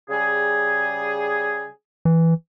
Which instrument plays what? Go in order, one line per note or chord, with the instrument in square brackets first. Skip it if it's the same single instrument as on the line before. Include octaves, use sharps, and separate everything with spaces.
[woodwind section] C#3 G3 G#4
[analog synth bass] E3